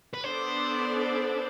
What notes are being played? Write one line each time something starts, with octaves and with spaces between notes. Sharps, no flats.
B4
B3 D4 A4 C5 D5